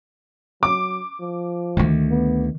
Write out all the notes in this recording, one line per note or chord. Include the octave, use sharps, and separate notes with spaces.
F#3 D6
F3
D2 D3 D#3 A3
B3